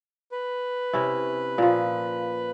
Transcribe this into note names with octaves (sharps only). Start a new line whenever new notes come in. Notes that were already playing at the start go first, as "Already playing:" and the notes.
B4
C3 C#4 E4
A#2 F3